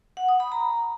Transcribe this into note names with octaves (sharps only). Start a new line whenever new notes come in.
F#5
D#6
B5
A#5